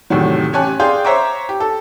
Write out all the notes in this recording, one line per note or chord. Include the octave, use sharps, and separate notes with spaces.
E2 A2 C3 D#3 F#3
A1 G4 C#5 G#5 A5 F#6
G#4 D5 F5 G5 C6 G6
C5 C#5 E5 A#5 D6
G4
A4